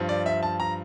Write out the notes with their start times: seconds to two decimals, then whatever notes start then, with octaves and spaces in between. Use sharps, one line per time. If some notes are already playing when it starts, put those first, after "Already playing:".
Already playing: G2 F3
0.09 D5
0.26 E5
0.43 A5
0.60 A#5